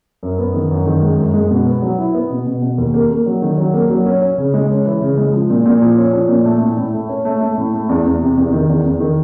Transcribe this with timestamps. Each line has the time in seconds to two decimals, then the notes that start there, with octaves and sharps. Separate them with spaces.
0.23 F#2
0.38 B3
0.54 D#3
0.71 F#2
0.86 D#3
1.02 G#3
1.18 F#2
1.34 G#3
1.51 B2
1.66 B3
1.82 F#3
1.98 E4
2.14 B3
2.30 B2
2.47 B2
2.62 B2
2.78 D#2
2.94 A#3
3.10 A#3
3.26 F#3
3.42 D#3
3.58 F#3
3.74 A#3
3.90 F#3
4.06 C#4
4.22 C#4
4.38 C#3
4.54 G#3
4.70 C#4
4.85 E3
5.01 C#3
5.17 G#3
5.33 F3
5.50 A#2
5.66 A#2
5.82 F3
5.97 C#4
6.13 F3
6.29 A#2
6.45 A3
6.61 A2
6.77 A2
6.93 A3
7.09 C#4
7.25 A3
7.41 A3
7.58 A2
7.73 A3
7.89 E2
8.05 E2
8.21 C3
8.37 E2
8.53 D#3
8.69 E2
8.85 E2
9.00 D#3